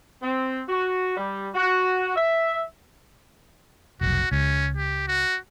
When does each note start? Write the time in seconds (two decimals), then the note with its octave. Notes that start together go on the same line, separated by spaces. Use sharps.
0.22 C4
0.68 F#4
1.17 G3
1.55 F#4
2.16 E5
4.01 F1 B1 F#4
4.32 C#2 C#4
4.77 G4
5.08 F#4